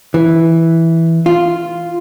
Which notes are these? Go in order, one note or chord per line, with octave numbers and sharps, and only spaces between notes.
E3
F4